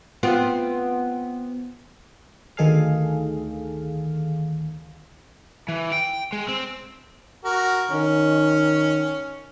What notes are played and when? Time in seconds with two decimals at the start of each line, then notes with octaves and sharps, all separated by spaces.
0.23 B3 C4 F4
2.57 D2 D#3 G#4 A4 F5
5.68 E3
5.92 G5
6.33 G#3
6.48 C4
7.45 F#4 A#4
7.91 D#3 C#4